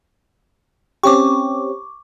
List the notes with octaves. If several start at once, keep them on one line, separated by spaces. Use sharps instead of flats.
C4 C#4 G4 C#6 D6